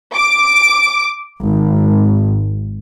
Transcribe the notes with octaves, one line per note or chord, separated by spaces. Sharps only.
D6
G#1